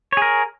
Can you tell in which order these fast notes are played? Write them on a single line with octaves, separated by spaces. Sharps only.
C#5 G#4 A#4